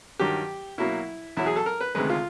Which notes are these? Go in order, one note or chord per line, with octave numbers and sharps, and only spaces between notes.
G2 D#3 F#3 G4
B2 F#3 A#3 E4
E2 B2 F#3 E4
G#4
A4
A#4
B4
D2 C3 D#3 G#3 B4
F4